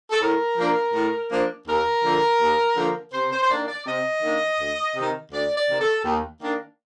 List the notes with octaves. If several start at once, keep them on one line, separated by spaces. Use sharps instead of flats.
A4
A2 A#4
F3 A#3 D4
A2
F3 A#3 D4
D#2 A#4
D3 F3 A#3
D#2
D3 F3 A#3
C3 C5
C5
C5
D#3 A#3 D4 D5
D5
C3 D#5
D#3 A#3 D4
D2
C3 D#3
D2 D5
D5
C3 D#3
A4
D#2
D#3 A#3 D4